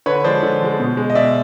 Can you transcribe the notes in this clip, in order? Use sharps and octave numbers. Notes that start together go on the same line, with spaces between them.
D3 B4 C#5
F3 G#3 C5 D5
D3
F3 G#3
B2
G#3
D#5
B2 D5 E5